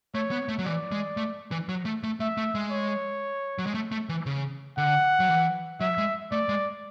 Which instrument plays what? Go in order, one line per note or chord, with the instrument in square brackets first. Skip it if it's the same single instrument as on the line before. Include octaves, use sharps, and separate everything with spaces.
[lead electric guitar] A3 [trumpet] C#5
[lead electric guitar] B3
A3
F#3
[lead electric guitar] E3 [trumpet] D5
[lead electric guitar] G#3
A3
E3
F#3
A3
A3
[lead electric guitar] A3 [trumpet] E5
[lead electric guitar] A3
G#3
[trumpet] C#5
[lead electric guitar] F#3
G#3
A3
A3
E3
C#3
[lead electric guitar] D3 [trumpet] F#5
[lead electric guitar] F#3
E3
[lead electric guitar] F#3 [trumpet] E5
[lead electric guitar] G#3
[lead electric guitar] A3 [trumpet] D5
[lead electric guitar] G#3